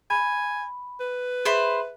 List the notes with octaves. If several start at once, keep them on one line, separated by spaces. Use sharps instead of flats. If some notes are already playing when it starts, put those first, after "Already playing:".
G#5 B5
B4
G#4 C5 E5 B5